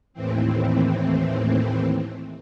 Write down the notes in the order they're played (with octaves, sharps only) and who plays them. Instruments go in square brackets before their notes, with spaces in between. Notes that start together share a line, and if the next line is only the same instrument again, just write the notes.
[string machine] D#2 A2 E3 C4